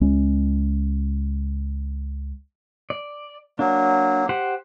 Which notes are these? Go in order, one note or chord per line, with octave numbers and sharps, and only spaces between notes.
C#2 G#3 C#4
D5
F#3 A#3 D4
G4 C5 F#5